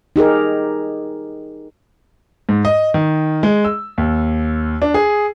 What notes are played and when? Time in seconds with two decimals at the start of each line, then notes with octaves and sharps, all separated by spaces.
0.16 D#4 G4 G#4 A#4
2.49 G#2
2.65 D#5
2.94 D#3
3.43 G#3
3.65 E6
3.98 D#2
4.82 D4
4.94 G#4